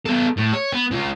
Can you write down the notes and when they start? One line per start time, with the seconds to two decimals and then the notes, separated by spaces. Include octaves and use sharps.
0.06 B3 A4
0.38 A2
0.54 C#5
0.72 B3
0.91 C#3 F4